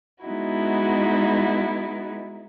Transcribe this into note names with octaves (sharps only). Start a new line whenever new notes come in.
G#3 B3 D#4 E4 F#4